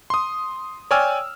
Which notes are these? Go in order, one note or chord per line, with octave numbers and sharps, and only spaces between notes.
C6 D#6
C#5 D5 G5 G#5 E6 F6